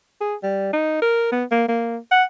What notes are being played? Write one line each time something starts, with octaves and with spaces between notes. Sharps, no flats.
G#4
G3
D#4
A#4
B3
A#3
A#3
F#5